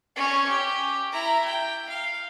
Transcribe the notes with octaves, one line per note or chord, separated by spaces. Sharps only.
C#4 C#5
G4
E4 A#5
G5
F5